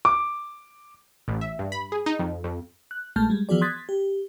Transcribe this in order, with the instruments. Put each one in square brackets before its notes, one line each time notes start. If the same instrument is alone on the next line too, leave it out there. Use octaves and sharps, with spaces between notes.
[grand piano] D6
[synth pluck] A1
E5
G2
B5
G#4
D#4
F2
F2
[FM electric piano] F#6
A#1 G#3 A3 A5 F6 G6
G3 G#3
E3 F3 B3 F#4 G#4 D5
C6 D#6 F#6 G#6 A6 B6
G4